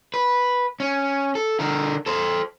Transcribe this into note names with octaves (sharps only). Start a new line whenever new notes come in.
B4
C#4
A4
D3 A#4
A4 C5